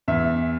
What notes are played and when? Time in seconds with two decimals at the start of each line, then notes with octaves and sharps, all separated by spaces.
0.08 E2 E5